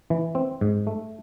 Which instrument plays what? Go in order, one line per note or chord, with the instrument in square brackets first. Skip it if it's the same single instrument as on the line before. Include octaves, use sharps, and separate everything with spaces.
[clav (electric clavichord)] E3
C4
G#2
A3